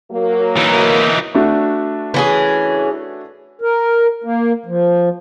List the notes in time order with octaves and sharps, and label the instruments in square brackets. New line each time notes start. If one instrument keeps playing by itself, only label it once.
[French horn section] F#3 A#3
[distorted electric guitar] E3 D#4
[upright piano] A3 D4 F#4
[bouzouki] E3 C#4 G#4
[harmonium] A#4
A#3
F3